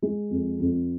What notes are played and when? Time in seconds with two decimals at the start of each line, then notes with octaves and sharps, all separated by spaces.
0.02 G#3
0.30 F2
0.59 F2